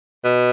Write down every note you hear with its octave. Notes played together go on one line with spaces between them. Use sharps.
B2